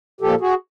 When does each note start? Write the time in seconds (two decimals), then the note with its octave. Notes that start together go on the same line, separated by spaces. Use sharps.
0.21 A#2 F3 A#3 G4 A4
0.40 F#4 G#4